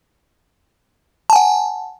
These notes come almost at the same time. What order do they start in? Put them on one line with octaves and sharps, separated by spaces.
A5 G#5 F#5